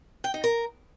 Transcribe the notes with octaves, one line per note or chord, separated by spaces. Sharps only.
G5
D#4
A#4